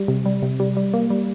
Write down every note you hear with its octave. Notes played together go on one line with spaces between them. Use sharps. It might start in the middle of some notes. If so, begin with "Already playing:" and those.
Already playing: G3
C3
G3
C3
G3
G3
A#3
G3